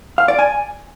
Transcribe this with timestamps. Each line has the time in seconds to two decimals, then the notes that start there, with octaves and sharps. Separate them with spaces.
0.18 F5
0.28 D5
0.39 G#5